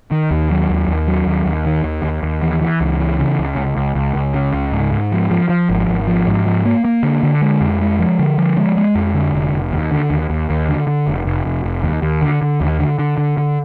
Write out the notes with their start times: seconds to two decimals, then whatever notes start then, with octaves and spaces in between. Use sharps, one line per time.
0.11 D#3
0.31 D#2
0.51 F#3
0.70 D#2
0.88 D#2
1.07 F#3
1.26 D#2
1.46 D#2
1.66 D#3
1.84 D#2
2.03 D#2
2.23 D#2
2.42 E3
2.61 E3
2.81 C#2
2.99 E3
3.20 C#3
3.39 C#2
3.57 C#2
3.77 C#2
3.95 C#2
4.15 C#2
4.34 C#3
4.53 C#2
4.72 G#2
4.92 G#2
5.12 F3
5.31 F3
5.49 F3
5.69 G#1
5.89 G#1
6.07 F3
6.27 G#2
6.46 F3
6.65 A#3
6.85 A#3
7.03 D3
7.23 D3
7.42 G#3
7.61 F2
7.81 G#3
7.99 F3
8.19 D3
8.38 F3
8.57 G#3
8.77 G#3
8.95 F2
9.14 D3
9.33 F1
9.53 F1
9.72 D#2
9.91 D3
10.10 D#2
10.30 D#2
10.50 D#2
10.68 D3
10.87 D3
11.07 F1
11.25 F1
11.45 F1
11.64 F1
11.83 D#2
12.02 D#2
12.22 D3
12.42 D3
12.61 D#2
12.79 D3
12.99 D3
13.18 D3
13.37 D3